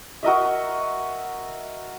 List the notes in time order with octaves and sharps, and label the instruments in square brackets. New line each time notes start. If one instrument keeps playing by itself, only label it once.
[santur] F#4 A#4 D#5 E5